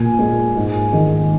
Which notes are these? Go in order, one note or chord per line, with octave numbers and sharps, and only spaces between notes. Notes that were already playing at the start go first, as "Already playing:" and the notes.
Already playing: A#2 G#5
G#3
G#2
D#3 G#3